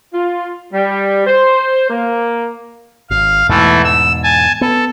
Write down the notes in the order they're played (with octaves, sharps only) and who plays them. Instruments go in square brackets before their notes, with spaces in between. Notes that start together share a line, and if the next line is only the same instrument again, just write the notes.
[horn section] F4
G3
C5
A#3
[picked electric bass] G#1 [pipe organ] F5
[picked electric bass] E2 G#2 B2 [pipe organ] E3 A3
[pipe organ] E6
G#5 A5
[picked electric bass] B3 [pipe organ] A4